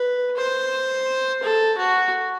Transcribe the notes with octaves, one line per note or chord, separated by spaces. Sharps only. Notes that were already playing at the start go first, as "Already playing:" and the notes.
Already playing: B4
C5
A4
F#4